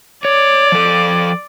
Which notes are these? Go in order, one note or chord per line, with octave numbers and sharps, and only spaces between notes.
C#5 D5
F3 A4